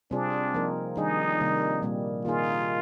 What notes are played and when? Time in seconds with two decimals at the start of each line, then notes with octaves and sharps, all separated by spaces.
0.11 C3 G3 C4 D4 F4 G#4
0.54 F3 A#3 D#4 A#4
0.97 D#3 G3 D4 D#4 G#4
1.40 C3 D#3 G3 A#3
1.82 A#2 G3 A#3
2.25 D#3 A#3 D#4 F4 G#4